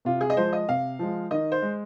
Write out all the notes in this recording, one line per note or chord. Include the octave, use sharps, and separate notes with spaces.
C3 F4
G#4
D#5
F3 G#3 C5
D#5
C3 F5
F3 G#3
D#3 D#5
C5
G#3